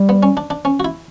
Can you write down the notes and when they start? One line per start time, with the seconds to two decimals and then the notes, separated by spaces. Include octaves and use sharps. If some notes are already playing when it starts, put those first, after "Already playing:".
Already playing: G3
0.09 B3
0.23 C#4
0.37 D4
0.50 D4
0.65 C#4
0.80 F#4
0.85 E4